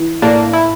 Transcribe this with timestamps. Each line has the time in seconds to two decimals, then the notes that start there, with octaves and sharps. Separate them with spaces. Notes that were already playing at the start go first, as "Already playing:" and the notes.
Already playing: E3
0.22 A2 A#3 D4
0.53 E4